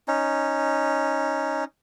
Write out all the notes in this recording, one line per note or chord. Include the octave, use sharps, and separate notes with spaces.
C#4 D#4